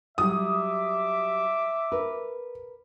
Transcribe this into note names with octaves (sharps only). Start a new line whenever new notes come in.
F#3 G3 E5 D6 D#6
A#4 B4